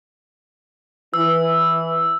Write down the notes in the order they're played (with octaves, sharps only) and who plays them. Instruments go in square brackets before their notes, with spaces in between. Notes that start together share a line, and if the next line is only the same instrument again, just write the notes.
[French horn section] E3 [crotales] E6